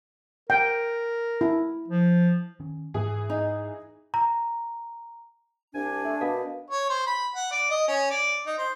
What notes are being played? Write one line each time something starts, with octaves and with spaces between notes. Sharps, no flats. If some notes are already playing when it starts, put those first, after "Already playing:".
A#4 G5
E4
F3
D#3 C#4
G#2 E3 G#4
D#4
A#5
C2 D4 G#5
A3
B2 A#4 F5
C#5
C5
B5
F#5
D5
D#5
C#4
D5
D#4
C5